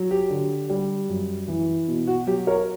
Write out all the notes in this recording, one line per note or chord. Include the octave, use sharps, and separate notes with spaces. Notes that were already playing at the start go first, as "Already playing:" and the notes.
Already playing: F#3
G4
D3
G3
F#2
E3
B2
F#4
F#3 G4
A#4 C#5